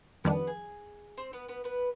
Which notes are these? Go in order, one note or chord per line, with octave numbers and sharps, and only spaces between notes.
F2 D#3 G3 B3 D4 B4
G#4
C4 C5
B3 B4
B3 B4
B3 B4